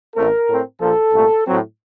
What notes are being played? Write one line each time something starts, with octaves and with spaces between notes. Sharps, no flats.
A1 A2 A3 C4 A#4
A2 A3 C4
A#1 A#2 F3 A4
C2 A#2 A3
A2 F#3 C4